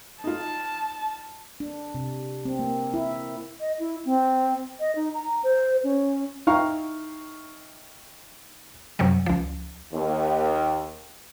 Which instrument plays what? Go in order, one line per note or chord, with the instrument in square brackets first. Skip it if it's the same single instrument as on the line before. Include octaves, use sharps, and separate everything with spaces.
[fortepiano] D#4 F4 [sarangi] A5
[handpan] D4
C3
C4
A#3
E4
[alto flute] D#5
E4
C4
D#5
D#4
A#5
C5
C#4
[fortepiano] D#4 E4 F5 G5 A#5 C#6
[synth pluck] F#2 C3 F#3 G3
C#2 F3
[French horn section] D#2